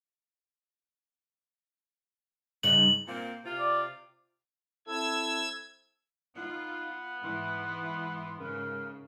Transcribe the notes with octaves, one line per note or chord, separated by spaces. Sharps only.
G2 C#3 D#4 F#7
A#2 A#3 C4
C3 F4
D5
C4 E4 A4 E6 G#6
B3 D#4 F4 F#5
G#2 E3 C6
G#2 C#3 A#4